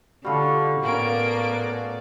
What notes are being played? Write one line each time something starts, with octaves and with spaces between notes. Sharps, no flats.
D3 G3 F4 F#4 A4
A2 A#3 B3 C#4 D5 G5 D7